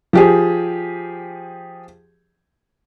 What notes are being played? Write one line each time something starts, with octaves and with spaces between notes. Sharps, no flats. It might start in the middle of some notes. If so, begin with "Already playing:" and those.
F3 G4 G#4